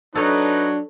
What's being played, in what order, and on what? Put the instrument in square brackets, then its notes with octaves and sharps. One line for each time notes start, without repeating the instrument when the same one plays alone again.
[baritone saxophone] F#3 [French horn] D4 [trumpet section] D#4 B4 [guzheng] A4 C#5